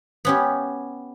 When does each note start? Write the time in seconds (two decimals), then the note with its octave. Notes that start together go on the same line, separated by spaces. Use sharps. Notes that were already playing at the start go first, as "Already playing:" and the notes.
0.25 B3 C#4 G4